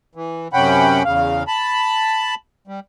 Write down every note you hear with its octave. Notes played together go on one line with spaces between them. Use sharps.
E3
F#2 C3 C#4 F#5 G5 B5
E2 C#3 F5
A5 B5
G3